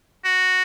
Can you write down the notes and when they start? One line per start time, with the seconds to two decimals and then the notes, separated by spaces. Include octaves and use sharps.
0.25 F#4